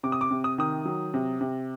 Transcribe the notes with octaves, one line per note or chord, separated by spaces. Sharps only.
C3 D6
D#6
D6
C3
D#6
D#3 D#6
F#3
C3
C3